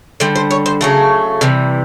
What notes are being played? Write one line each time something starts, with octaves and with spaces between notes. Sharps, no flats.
D3 G3 C5
C5
C#5
C5
C#3 F#3 A3 A#4
C3 E3 G3